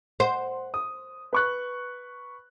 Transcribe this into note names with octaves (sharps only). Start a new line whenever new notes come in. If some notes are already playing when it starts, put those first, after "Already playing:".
C5 F#5
D#6
B4 C#6 F#6